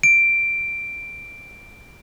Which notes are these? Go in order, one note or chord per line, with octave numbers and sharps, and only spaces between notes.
D7